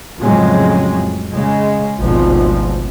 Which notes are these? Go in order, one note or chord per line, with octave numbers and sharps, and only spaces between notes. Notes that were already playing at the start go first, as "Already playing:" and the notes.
F2 A2 C#3 F#3 G#3
C#3 G#3
G#1 D2 B2 F3